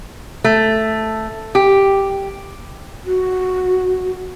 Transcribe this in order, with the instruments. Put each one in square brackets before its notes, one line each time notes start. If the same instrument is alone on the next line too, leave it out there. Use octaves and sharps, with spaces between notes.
[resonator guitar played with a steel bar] A3
G4
[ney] F#4